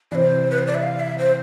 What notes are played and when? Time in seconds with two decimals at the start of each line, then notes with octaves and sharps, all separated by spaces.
0.12 C3 E3 C5 D5
0.51 B4
0.59 C5
0.67 D5
0.74 E5
0.83 F5
1.00 E5
1.18 C5